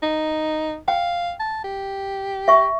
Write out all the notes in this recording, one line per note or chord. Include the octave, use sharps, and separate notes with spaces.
D#4
F5 G5
A5
G4
E5 C#6